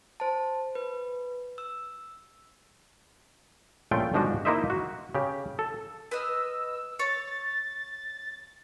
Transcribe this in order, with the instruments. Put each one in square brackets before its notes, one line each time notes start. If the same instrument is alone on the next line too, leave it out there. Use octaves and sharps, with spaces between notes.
[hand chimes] C5 A5
B4
E6
[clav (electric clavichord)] A#1 C#3 A3 F4 G5
G1 G#2 F3 D4 F#4
A#3 D#4 E4 C5 D#5 E5
F#4
C#3 G4
A4
[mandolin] B4 D#5 F6 [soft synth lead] E6
[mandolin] C#5 [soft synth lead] A6